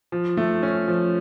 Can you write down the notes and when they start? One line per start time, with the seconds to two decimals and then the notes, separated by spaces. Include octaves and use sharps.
0.12 F3
0.37 A3
0.63 C#4
0.88 F3